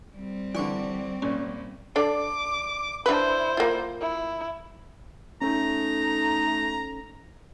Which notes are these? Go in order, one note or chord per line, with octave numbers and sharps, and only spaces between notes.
G3 C4
D3 E3 D5 C#6 D6
G#1 A#2 C#4
D4 A4 D5 D6
D4 E4 B4 C5
A#3 F4
E4
A3 C#4 D#4 A4 A#5